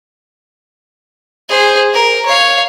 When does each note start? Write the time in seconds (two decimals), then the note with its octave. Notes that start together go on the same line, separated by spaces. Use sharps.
1.49 G#4 C5
1.94 A#4
2.25 C#5 F5